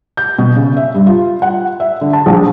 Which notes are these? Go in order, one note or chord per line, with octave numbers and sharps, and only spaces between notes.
G6
B2
C#3
E5
G2
F4
F#5
E5
D3
A5
A#1